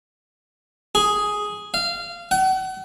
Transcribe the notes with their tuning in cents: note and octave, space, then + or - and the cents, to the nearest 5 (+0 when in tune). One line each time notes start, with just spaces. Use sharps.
G#4 +5
F5 -20
F#5 +40